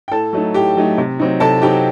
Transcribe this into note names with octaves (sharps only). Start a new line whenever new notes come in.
G5
A2 A4 A5
F#3 A3 D#4
A2 G4 G5
F#3 A3 D#4
C3
F#3 C4 D#4
C3 A4 A5
F#3 C4 D#4 G4 G5